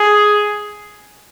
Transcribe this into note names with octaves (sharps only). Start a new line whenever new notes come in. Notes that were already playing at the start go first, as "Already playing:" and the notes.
Already playing: G#4